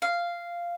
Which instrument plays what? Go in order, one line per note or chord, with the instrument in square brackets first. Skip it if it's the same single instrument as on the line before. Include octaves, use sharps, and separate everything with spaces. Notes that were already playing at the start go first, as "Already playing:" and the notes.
[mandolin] F5